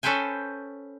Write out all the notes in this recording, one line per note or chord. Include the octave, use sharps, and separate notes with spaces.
C#4 A4 B4 C5 G5 G#5